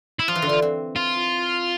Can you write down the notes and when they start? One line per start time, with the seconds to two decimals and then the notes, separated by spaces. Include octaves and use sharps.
0.19 E4
0.28 F3 F4
0.35 E3
0.42 D3
0.49 E3
0.62 C4
0.96 F4